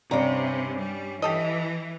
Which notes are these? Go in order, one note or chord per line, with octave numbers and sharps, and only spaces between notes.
G2 C3 C#4 A#5
G3
E3 G4 A4 D#5